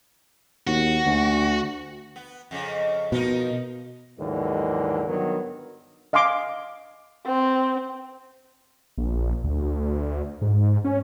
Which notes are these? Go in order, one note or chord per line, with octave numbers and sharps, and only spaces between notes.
D#2 F#4
D2
B3
F2 C#3
B2 F3 D#4 A#4
D#2 G#2 D3 E3 F#3 G#3
G2 D#3 F#3 B3
D#5 F5 G#5 C6 D6
C4
A#1
D2
G#2
C#4